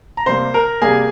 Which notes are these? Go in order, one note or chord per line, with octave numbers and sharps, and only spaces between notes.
A#5
C3 G3 A#3 C5 C6
A#4 A#5
C3 G3 A#3 G#4 G#5